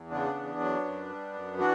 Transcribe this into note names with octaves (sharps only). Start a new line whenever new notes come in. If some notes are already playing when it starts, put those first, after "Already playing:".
Already playing: E2
C#3 B3 D4
E2
F#3
F#2
G3
F#2
E3 D4 F#4